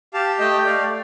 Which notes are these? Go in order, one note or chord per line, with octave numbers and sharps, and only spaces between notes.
G4 F5 A5
A3 D#5 G5
A3 D5 F5